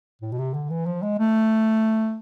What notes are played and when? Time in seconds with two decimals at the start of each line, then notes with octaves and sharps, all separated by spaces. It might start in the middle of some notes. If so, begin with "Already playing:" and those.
0.22 A2
0.32 B2
0.38 C3
0.54 D3
0.70 E3
0.86 F3
1.02 G#3
1.18 A3